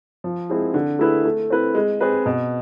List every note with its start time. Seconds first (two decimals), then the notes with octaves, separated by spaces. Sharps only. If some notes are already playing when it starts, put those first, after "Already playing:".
0.24 F3
0.49 G#3 C4 E4 G#4
0.74 D3
0.99 A3 E4 G#4 B4
1.25 A3
1.50 C4 E4 B4
1.75 G#3
2.01 C4 G#4 B4
2.26 B2